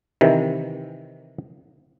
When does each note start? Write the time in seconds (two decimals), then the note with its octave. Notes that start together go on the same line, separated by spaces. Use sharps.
0.21 C3 D#3 E3